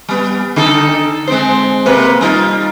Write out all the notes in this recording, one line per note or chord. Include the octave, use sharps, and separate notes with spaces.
G3 B3
D3 D#4 A4
G#3 C4 C5
C3 A#3 B4
G3 D#4 F4